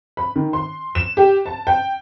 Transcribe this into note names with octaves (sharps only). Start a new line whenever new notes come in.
B5
D#3
C6
E7
G4
A5
G5